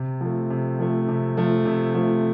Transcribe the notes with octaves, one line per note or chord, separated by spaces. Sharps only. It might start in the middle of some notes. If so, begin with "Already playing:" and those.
Already playing: C3
F3 A3
C3
F3 A3
C3
F3 A3
C3
F3 A3